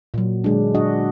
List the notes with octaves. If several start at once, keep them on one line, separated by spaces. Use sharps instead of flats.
A#2 F#3
D3 G#3 D4
D4 F#4 D#5 F#5